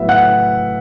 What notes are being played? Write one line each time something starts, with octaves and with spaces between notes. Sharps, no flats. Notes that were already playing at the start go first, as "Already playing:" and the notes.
Already playing: A2 F#3 B3 E5
F#5 F#6